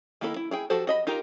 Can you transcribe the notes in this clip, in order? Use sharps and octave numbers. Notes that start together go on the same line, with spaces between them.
D#3 A#3 E4 A4 B5
E4
E4 G#4 G5
F3 F#4 G4 A4 C5
F#4 D#5 B5
D#4 F4 G4 A#4